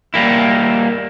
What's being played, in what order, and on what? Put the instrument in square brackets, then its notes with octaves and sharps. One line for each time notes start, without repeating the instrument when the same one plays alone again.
[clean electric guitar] G3 A#3 E4